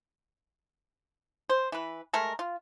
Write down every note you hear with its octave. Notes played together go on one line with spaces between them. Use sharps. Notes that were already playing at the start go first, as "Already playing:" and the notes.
C5
E3 B4
G#3 A3 A#4
F4